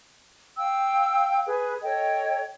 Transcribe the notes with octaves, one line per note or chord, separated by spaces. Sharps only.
F5 G5 E6
G#4 B4
A4 C#5 D#5 G5